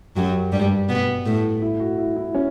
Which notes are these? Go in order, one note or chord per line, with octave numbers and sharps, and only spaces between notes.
F#2 F#3 G4
G2 G3
B2 B3
A2 A3
E4
F#4
E4
E4
C#4